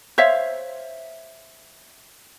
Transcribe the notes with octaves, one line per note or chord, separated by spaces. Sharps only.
C5 C#5 E5 F5